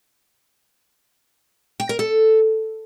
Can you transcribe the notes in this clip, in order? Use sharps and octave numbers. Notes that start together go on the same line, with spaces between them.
G5
A#4
A4